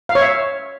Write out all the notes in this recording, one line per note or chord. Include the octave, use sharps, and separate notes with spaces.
F5
C#5
E5